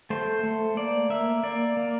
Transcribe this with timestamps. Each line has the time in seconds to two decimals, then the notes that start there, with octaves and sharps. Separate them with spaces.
0.10 A3 C5
0.43 A3
0.77 A#3 D5
1.10 A#3 E5
1.43 A#3 D5
1.77 A#3